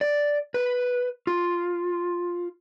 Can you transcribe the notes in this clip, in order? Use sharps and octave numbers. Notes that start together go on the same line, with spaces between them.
D5
B4
F4